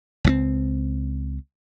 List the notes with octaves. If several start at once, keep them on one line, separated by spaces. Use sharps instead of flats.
C#2 F#3 C4